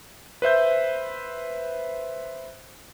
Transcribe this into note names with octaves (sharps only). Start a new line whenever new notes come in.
B4 C5 E5 G6